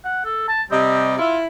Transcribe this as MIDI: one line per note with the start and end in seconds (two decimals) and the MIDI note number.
0.04 0.23 78
0.25 0.46 69
0.48 0.62 81
0.70 1.13 48
0.70 1.13 55
0.70 1.01 60
0.70 1.13 75
1.18 1.47 64
1.18 1.37 65